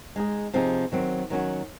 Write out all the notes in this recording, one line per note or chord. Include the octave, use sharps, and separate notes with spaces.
G#3 D#4 G#4
C3 F3 C4 D#4 G#4
D#3 F#3 C4
D#3 F#3 C#4 F#4